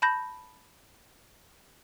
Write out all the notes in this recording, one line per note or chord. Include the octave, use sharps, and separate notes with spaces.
A5 B5 G6 A#6